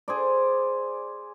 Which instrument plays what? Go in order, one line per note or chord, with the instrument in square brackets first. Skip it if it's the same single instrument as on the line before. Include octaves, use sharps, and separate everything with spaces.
[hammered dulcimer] G#4 C5 D5